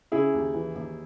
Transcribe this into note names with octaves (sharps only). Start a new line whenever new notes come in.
C#3 E4 G#4
D#2
E3
D#2